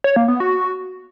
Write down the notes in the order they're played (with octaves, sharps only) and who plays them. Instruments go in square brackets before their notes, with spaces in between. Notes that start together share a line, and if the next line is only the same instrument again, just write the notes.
[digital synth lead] C#5
A#3
B3
F#4